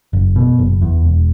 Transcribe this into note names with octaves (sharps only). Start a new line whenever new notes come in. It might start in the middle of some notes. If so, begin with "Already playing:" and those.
F#1
B2
F#1
E2
E1